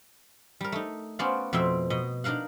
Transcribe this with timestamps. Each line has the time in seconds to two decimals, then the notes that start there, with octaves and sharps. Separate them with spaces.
0.61 G3 A#4
0.72 A3 D#4
1.19 B3 C#4 F#4 C5 D5 F5
1.53 F2 B2 C4 C5 E5 G5
1.90 B2 D#5
2.24 D4 D#4 A#4 F5 F#5